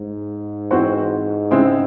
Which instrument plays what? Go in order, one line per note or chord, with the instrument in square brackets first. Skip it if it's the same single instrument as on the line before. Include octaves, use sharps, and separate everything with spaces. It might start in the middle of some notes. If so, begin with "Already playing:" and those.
Already playing: [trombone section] G#2
[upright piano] E3 C4 F#4 C5
C#3 G#3 C4 E4 G#4